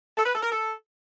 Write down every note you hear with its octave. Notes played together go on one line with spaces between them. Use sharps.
A4
B4
A4
A#4
A4